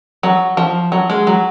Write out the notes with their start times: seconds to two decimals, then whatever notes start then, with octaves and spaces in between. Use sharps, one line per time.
0.23 F#3
0.57 F3
0.92 F#3
1.10 G#3
1.27 F#3